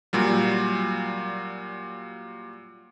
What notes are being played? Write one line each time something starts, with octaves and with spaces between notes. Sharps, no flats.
A#2 F#3 G3